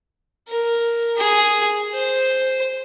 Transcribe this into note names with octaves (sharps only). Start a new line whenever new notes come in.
A#4
G#4
C5